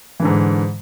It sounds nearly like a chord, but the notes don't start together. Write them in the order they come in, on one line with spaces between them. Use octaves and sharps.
E3 D3 G#2